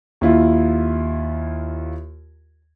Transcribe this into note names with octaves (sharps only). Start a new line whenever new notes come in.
D#2 E4 F4